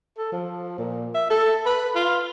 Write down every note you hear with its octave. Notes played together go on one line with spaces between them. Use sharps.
A4
F3
A#2
E5
A4
B4
F4